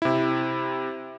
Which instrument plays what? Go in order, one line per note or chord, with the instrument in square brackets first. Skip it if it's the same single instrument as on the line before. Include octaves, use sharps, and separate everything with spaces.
[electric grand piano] C3 E4